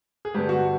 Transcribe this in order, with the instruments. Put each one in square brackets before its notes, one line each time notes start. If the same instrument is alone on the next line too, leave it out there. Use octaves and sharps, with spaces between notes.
[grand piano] G#4
G2 D3 G3 B3 G4
F#4